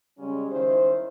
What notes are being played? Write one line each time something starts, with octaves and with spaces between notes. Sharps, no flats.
C#3 G3 G#3 C#4
D#3 C#4 E4 C5